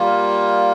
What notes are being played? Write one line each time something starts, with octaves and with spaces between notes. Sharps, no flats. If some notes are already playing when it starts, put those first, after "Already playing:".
Already playing: G3 A#3 F4